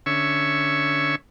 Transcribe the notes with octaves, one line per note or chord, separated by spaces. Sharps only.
D3 C#4 C#5 E5 C#6 E6